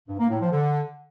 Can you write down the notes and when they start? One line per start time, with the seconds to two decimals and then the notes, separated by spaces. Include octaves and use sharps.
0.08 G2
0.19 A#3
0.30 A2
0.41 F3
0.51 D3